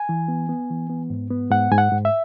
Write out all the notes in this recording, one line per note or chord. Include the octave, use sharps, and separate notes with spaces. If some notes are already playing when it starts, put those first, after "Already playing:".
Already playing: G#5
E3
B3
B3
E3
B3
G#2
B3
G#2 F#5
G#2 G#5
F#5
G#2
E5